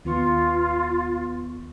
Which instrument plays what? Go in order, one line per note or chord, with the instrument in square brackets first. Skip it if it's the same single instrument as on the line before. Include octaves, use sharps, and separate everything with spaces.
[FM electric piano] D#2 B3 C#6 [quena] F4